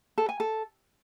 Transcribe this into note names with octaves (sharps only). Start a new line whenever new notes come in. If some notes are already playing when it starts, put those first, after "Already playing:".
A4
G#5
A4